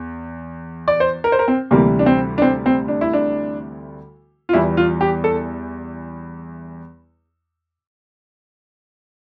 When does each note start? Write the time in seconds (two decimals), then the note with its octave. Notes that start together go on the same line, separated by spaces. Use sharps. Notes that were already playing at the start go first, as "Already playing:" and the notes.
Already playing: E2
0.88 D5
1.00 C5
1.24 A#4
1.32 C5
1.39 A#4
1.48 C4
1.71 D2 C3 E3 G3 A#3
1.99 D4
2.06 C4
2.38 D4
2.42 C4
2.66 C4
2.88 D4
3.01 E4
3.13 D4
4.49 F4
4.53 E2 E3 G3 E4
4.77 F4
5.01 G4
5.24 A4